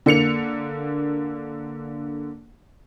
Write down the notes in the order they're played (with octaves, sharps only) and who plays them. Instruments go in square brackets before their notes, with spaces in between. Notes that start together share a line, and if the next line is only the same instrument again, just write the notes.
[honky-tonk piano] D3 A#3 C#7 F7